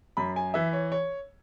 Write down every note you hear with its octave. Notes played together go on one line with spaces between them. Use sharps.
F#2 B5
G#5
E3 E5
C#5
C#5